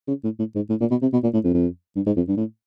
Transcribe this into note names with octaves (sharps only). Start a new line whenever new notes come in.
C#3
A2
A2
G#2
A2
A#2
B2
C3
B2
A#2
A2
F2
F2
G2
G#2
F2
G2
A2